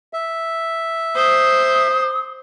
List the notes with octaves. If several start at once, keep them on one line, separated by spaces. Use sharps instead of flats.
E5
C5 D#6